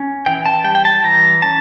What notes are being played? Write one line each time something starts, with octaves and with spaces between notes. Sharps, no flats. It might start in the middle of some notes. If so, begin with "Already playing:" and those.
Already playing: C#4
E3 G5
A5
G3 G5
G5
A5
E3 A#5
C#4 A5